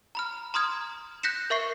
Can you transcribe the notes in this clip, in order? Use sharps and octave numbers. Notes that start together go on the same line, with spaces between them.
A#5 B5 F6
A#5 C6 D#6 F6 G#6
F#6 G6 A#6 B6 C#7 E7
A#4 E5 C#6 C7